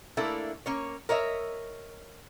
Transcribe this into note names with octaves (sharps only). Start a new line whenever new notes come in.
A3 A#3 D4 E4 A4
A#3 C#4 C#5
A#4 C#5 D#5 E5